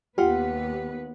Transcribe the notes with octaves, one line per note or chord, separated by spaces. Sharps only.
D#2 B3 F4 G4 B4 F#5